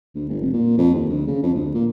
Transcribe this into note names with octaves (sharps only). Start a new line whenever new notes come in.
D2
G1
F1
A#2
F2
D#2
D2
C#3
F2
D2
A#2